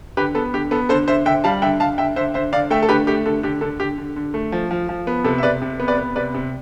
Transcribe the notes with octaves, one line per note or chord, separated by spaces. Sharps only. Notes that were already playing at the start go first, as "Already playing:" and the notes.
D3 G4 B4
B3 A4
D3 G4
B3 A4
D3 A4 C5
D3 C5 E5
D3 E5 G5
G3 F5 A5
D3 E5 G5
D3 F5 A5
D3 E5 G5
D3 C5 E5
D3 C5 E5
D3 D5 F5
A3 E5 G5
A4
D3 G4 B4
A3 G4
D3 A4
D3 G4
D3 A4
D3 G4
D3
D3
A3
F3
F3
F3
B3
C3 A4
E5
C3 B4 D5
C3
B3
B4 D5
B3
C3 B4 D5
C3